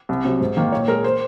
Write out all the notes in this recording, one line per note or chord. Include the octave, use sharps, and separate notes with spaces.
C2
C3 F#3
G#2
D#3 A#3
A#2 C#5
G#3 A#4
C5